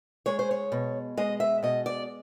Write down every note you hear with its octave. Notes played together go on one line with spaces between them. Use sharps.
G#3 C#5
C5
C#5
B2
G#3 D#5
E5
B2 D#5
D5